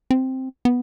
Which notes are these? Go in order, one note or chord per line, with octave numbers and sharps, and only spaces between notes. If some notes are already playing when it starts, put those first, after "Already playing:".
C4
B3